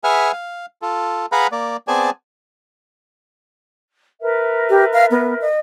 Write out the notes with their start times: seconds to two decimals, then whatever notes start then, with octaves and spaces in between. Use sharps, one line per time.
0.04 G#4 B4 E5 F#5 G#5 F6
0.32 F5
0.82 F4 A4
1.32 G#4 B4 F5 F#5 A#5 B5
1.52 A#3 D5
1.88 B3 C4 G#4 D5 G#5 A5
4.21 A#4 B4 E5
4.70 G4
4.93 F5
5.11 B3
5.41 D#5